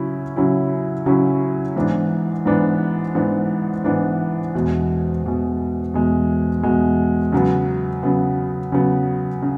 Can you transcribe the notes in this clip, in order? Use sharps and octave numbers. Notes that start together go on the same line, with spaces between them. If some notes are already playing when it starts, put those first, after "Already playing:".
Already playing: C#3 F#3 C#4 E4
C#3 F#3 C#4 E4
C#3 F#3 C#4 E4
G#2 E3 B3 D4
G#2 E3 B3 D4
G#2 E3 B3 D4
G#2 E3 B3 D4
E2 B2 G#3
E2 B2 G#3
E2 B2 G#3
E2 B2 G#3
C#3 F#3 B3
C#3 F#3 B3
C#3 F#3 B3
C#3